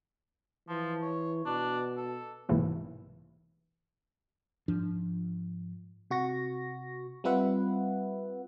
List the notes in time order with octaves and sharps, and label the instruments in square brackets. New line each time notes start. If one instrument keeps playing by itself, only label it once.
[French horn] E3 [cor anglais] F3
[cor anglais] C#5
[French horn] B2 [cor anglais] D4
[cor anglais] A4
[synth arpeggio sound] B1 G#2 C3 E3 A#3
[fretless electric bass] G#2 F3 D4
[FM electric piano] C3 F#4 C#6 A#6
G3 C4 F4 B4 E5 F#5